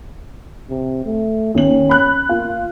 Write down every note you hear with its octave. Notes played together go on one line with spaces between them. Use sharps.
C3
A3
D#2 C#4 F#7
B5 F#6
A#3 F4